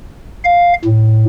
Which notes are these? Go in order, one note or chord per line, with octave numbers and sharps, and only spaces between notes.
F5
A2